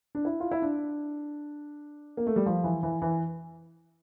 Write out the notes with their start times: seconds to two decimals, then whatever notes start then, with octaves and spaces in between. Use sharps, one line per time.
0.15 D4
0.25 E4
0.40 F4
0.51 E4
0.62 D4
2.17 A#3
2.27 A3
2.36 G3
2.46 F3
2.64 E3
2.83 E3
3.02 E3